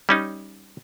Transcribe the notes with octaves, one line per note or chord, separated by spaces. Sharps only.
G3 C#4 D#4